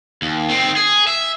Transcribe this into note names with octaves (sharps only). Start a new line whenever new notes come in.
D#2
D#3 C4
G#4
E5